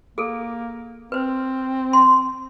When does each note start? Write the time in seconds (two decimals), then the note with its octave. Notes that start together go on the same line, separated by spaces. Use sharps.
0.18 A#3 G#4 A4
1.12 C4 B4 C5
1.93 C6